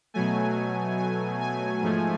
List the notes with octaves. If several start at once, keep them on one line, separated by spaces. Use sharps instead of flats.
B2 F#3 A3 G#5
G#5
G#5
G#2 F3 A3